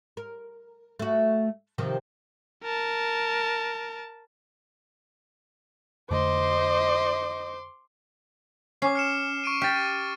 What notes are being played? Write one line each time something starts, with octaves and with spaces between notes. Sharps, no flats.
A#4
A3 F#4
C3 D#3 F3
A#4 A5
F2 D3 A3 C5 D#5 C6 D6
C#4 D6 C7
F6 C#7 E7
C#6 D7 D#7
G4 F6 A6